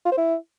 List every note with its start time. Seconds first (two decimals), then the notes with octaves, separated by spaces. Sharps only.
0.05 F4
0.11 C5
0.17 E4